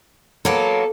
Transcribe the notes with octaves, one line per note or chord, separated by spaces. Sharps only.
F#3 A#3 B3 A4